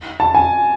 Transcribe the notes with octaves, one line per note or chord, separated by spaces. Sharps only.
A5
G#5